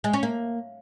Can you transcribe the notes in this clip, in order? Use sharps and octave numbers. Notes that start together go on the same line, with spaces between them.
G#3
C#4
A#3